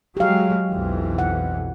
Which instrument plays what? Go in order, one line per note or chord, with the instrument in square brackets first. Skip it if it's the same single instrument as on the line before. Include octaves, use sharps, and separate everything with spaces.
[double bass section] F#3 G#3 [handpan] G4 F5
[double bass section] B1 F2 E3
[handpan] F#5